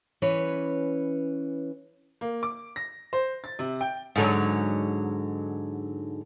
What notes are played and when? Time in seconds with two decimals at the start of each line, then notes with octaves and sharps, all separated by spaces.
0.22 E3 C#4 B4 C#5
2.21 A#3
2.43 D6
2.76 A#6
3.13 C5
3.44 A6
3.59 C3
3.81 G5
4.16 G#2 D3 F#3